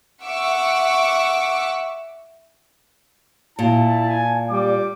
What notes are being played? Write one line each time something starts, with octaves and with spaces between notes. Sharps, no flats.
E5 F#5 C#6 D6 E6
A#2 E4 A5
G#5
G3 D6